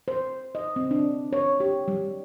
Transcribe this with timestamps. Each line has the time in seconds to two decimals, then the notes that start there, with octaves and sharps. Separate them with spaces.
0.08 C5
0.55 D#5
0.76 C4
0.91 D4
1.33 C#5
1.60 G4
1.88 G3